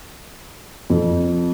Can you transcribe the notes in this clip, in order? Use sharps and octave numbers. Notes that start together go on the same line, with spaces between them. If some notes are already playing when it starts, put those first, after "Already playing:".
F2